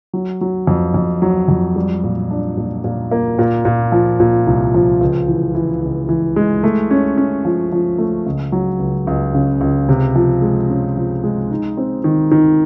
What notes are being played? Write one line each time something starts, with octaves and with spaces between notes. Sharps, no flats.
F#3
F#3
F2
F2
F#3
F2
G3
A#2
D4
A#2
A#2
A#3
A#2
A#2
F3
A#2
C2
F3
C#2
E3
E3
C#2
E3
G#3
A3
C#4
C#4
F3
F3
A3
C#2
F#3
C#2
C#2
C#3
C#2
C3
F3
G#3
C#4
F3
G#3
D#4
C4
D#3
D#3